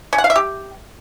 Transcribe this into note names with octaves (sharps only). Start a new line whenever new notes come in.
C#4
F#5
F5
E5
G4